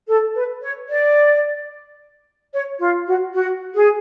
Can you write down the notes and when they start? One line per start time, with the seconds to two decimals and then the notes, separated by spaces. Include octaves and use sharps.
0.08 A4
0.35 B4
0.62 C#5
0.89 D5
2.53 C#5
2.80 F4
3.07 F#4
3.34 F#4
3.75 G#4